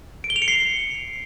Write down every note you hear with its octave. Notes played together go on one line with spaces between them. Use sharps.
D7
G7
F7
C#7
C7